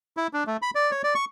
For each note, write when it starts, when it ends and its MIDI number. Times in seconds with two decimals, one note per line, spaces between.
0.17 0.27 64
0.33 0.44 62
0.47 0.57 57
0.62 0.70 83
0.75 0.91 74
0.91 1.02 73
1.04 1.14 74
1.15 1.25 85